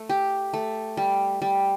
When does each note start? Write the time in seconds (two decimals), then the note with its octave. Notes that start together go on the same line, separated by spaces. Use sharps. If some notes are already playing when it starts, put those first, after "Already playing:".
Already playing: A3
0.09 G4
0.54 A3
0.97 G3
1.42 G3